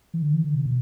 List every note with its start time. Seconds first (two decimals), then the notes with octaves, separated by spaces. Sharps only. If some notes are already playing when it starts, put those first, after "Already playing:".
0.14 E3
0.22 D3
0.34 E3
0.44 D3
0.54 C3
0.65 B2